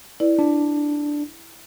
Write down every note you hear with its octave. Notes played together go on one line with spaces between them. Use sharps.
E4 B4 D5
D4